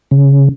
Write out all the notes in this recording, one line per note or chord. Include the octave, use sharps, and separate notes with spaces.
C#3